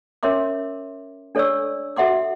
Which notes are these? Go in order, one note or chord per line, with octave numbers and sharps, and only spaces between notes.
C#4 A#4 C#5 E5 C6 D6
D4 A4 C#5 D5 C#6 E6
F#4 A4 E5 F#5 C6 D6